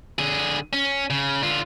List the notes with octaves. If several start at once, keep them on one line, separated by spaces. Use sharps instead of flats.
D3 G#4
C#4
C#3
D3 F4